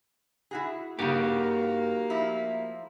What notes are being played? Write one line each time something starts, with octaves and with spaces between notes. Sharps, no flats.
E4 F#4 G#4
G2 C#3 A#3 D#4 F#4 G4
F3 A3 E4